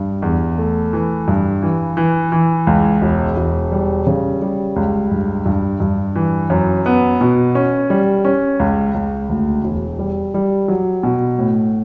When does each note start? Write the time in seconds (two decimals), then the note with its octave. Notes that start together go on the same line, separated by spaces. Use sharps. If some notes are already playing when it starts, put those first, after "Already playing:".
Already playing: G2
0.22 E2
0.58 A3
0.93 E3
1.28 G2
1.63 E3
1.97 E3
2.32 E3
2.67 C#2
3.02 E1
3.37 E1
3.72 G3
4.07 C#3
4.42 G3
4.76 C#2
5.11 G2
5.46 G2
5.80 G2
6.16 E3
6.50 F#2
6.86 B3
7.21 B2
7.55 C#4
7.90 G3
8.25 C#4
8.60 C#2
8.94 C#2
9.29 D2
9.64 E1
9.99 G3
10.34 G3
10.68 F#3
11.03 B2
11.39 A2